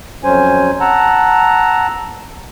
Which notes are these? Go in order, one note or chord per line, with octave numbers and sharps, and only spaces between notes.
F2 F#3 C#4 C5 G#5
F#5 A5 A#5 E6